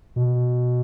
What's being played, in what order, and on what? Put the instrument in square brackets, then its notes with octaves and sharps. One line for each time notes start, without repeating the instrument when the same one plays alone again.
[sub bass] B2